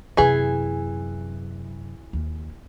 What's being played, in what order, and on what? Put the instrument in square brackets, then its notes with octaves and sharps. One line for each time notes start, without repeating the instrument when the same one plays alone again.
[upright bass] F#2 C3 [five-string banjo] E3 G#4
[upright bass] D#2